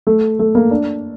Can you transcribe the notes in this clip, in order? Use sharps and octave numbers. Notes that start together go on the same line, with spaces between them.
A3
A3
A#3
D4